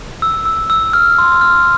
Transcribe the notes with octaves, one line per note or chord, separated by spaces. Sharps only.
E6
E6
E6
F6
C6
F6